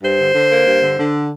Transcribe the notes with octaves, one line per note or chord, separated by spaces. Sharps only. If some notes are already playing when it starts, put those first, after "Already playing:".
G2 C5
D3
D3
A#3
G2
D3
D3